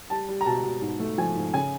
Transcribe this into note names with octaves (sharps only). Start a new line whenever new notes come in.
G3 A5
G3
A#5
B2 A5
B2
G#2
A3
F3 G#5
G#2
C#3 G#5